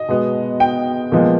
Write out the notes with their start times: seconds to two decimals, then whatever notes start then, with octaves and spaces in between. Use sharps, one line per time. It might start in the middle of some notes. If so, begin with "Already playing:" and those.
Already playing: D#5
0.08 B2 G#3 B3
0.60 G5
1.12 A#2 F3 G#3 B3